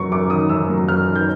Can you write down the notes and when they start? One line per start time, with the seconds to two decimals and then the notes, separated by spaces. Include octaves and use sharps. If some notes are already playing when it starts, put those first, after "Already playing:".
Already playing: F#2 F#3 C#6
0.12 F#2 D6
0.30 D#3 D#6
0.49 F#2 E6
0.69 F#3
0.88 F#2 F6
1.07 D#3
1.16 G6